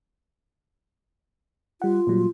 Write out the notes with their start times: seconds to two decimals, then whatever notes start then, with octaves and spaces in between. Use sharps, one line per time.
1.82 G3 F4 F#5
2.07 A#2 F#3 G3